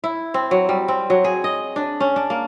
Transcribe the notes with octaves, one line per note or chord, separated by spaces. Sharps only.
E4
C4
F#3
G3
C4
F#3
G#4
D#5
D4
C#4
D4
A#3